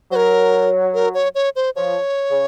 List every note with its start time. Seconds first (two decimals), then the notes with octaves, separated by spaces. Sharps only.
0.11 F#3 C5
0.16 A#4
0.94 A#4
1.14 C#5
1.35 C#5
1.56 C5
1.76 F3 C#5
2.30 C#3